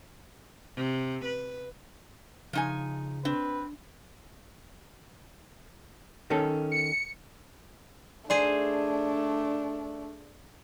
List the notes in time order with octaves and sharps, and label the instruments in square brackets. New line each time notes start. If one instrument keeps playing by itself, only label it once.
[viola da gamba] C3
B4
[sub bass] C#3 [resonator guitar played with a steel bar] F3 D#4 G#5
[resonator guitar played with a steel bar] C4 [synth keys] D4 [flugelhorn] B4
[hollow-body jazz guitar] D#3 C#4 A4
[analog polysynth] C#7
[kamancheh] A3 D4 [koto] G#4 C5 [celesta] D5